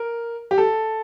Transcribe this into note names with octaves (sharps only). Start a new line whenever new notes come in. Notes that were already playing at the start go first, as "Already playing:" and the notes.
Already playing: A#4
G4
A4